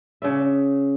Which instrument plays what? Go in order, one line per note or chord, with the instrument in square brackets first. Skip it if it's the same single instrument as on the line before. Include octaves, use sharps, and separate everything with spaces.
[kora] C#3 D5 E5